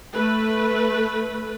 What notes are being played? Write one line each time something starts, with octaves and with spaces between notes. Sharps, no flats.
A3 B4